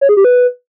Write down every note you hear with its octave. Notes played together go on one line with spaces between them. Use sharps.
C#5
G#4
G4
B4